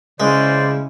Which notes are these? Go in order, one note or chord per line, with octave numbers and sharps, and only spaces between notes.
C#3 G#3 C#4 E4 C5 D5